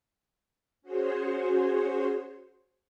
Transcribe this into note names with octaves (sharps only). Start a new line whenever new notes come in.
C#4 F#4 G#4 C5 C#5